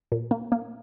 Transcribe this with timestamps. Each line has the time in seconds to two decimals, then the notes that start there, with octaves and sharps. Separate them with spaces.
0.12 A#2
0.31 A#3
0.52 A#3